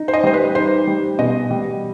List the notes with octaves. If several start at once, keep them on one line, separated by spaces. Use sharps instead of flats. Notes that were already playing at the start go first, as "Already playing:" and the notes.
Already playing: D#4
C5
D#5
G3 C5
B4
D#4 C5
G3
B2 D#5
G3